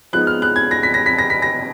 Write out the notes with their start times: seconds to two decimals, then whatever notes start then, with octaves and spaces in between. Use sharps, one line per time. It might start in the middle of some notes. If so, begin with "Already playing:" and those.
0.13 F3 G#3 B3 D#4 F#6
0.27 F6
0.42 F#6
0.56 G#6
0.71 A#6
0.83 B6
0.94 A#6
1.06 B6
1.19 A#6
1.30 B6
1.42 A#6